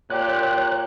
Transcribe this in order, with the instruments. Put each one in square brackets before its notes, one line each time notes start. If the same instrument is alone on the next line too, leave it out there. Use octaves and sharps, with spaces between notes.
[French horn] A#2 [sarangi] G4 [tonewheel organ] C#5 F#6